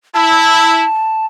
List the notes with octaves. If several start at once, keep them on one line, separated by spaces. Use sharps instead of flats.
E4 A5